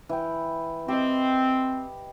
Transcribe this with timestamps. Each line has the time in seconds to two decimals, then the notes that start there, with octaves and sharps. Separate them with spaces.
0.09 E3 G5
0.88 C4 G4 D#5